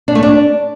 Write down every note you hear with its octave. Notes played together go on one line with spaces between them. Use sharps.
D4
A3
D4